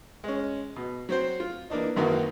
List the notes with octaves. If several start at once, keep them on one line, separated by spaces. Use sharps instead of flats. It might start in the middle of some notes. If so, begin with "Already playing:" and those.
G#3 C#4
B2
F#3 C4 C5
F4
E3 A#3 D4 D#4
G#1 F#2 D#3 E3 A#3 F#4